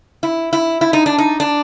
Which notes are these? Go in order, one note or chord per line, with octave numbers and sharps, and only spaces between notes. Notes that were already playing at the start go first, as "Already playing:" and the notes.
E4
E4
E4
D#4
D4
D#4
D4